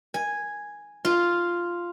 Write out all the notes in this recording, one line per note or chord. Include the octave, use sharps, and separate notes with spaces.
G#5
F4